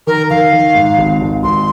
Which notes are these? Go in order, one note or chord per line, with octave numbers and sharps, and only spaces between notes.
D#3 A#4
D#3 F5
D#3
G#2
G#1
G#1
G#1 C6